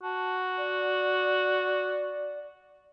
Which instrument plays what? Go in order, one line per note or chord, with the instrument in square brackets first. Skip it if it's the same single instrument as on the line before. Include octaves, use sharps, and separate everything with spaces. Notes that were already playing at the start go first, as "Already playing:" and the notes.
[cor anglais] F#4 [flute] A5
[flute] D5